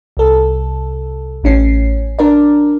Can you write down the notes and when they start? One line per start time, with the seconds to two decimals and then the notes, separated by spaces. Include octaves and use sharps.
0.17 C2 A4
1.43 A1 A2 C#4 C7
2.19 D4 A#4 D5